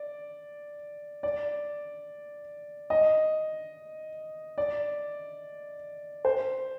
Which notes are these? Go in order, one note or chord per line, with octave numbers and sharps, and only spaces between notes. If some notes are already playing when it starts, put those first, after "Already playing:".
Already playing: D5
D5
D#5
D5
C5